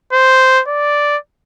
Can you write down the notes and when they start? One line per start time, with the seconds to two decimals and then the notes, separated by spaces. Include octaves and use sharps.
0.13 C5
0.68 D5